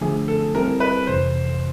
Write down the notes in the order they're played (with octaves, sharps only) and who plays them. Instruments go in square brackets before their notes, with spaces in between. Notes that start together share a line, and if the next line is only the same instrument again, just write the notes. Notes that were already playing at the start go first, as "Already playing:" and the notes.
[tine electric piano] D3 F3 A3 [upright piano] G#4
[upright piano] A4
[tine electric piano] G3 C4 E4 G4 [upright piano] A#4
[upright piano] B4
[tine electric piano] F2 C3 E3 [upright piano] C5